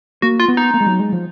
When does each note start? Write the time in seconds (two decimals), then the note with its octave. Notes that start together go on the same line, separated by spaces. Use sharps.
0.22 A#3 F#4
0.40 F4
0.48 B3
0.57 D#4
0.74 A#3
0.80 G#3
0.86 F#3
0.99 G#3
1.12 F3